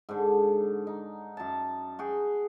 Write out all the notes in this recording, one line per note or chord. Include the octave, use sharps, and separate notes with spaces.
G#2 D3
D#4
F#2 A5
F#4 G#4 G5